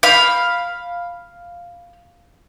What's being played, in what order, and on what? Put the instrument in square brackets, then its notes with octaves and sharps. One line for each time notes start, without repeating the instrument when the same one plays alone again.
[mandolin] F5 B5